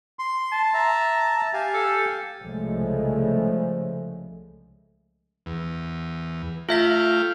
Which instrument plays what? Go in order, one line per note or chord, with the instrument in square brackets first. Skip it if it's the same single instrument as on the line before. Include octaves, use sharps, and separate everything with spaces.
[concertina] C6
[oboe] A5
[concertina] E5 A#5
G4 F5 G#5
[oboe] A4
[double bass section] C2 C#3 F3 G#3 A3
[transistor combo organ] E2
[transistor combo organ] A3 F5 G5 [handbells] F4 E5 B6